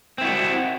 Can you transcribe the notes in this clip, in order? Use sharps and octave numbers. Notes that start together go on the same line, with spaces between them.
C4 E4 F#4